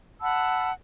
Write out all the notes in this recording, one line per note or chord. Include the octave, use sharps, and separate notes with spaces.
F#5 A5 B5 E6